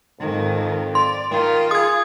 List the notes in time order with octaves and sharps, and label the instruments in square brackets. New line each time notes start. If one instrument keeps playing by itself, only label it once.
[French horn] F2 [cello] G#2 D#3
[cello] D5 [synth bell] C6
[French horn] D#3 [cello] F4
[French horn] G#4 [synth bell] D#6 G#6